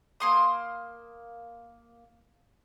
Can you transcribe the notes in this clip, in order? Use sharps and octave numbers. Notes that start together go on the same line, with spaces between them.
A#3 C6 D#6